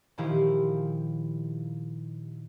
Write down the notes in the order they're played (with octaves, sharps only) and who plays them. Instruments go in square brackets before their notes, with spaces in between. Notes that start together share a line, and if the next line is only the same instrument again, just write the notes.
[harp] A#2 D#3 F3 E4 F4 G4